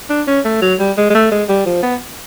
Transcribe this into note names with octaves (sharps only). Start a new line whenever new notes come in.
D4
C#4
A3
F#3
G3
G#3
G#3
A3
G#3
G3
F3
B3